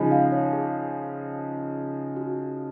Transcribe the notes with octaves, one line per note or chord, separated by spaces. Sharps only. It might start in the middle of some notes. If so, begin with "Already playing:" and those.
Already playing: C#3 F3 G#3 D#4 G#5 B5
F5
C#5
G#4
F#4